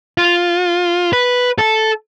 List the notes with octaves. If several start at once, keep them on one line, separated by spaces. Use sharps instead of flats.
F4
B4
A4